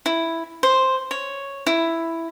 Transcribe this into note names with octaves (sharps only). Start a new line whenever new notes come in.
E4
C5
C#5
E4